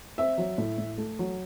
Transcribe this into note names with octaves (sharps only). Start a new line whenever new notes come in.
C4 E5
F#3
A2
A2
A3
F#3